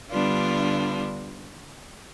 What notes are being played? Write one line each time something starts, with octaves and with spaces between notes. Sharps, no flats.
D3 G3 B3 D4 F4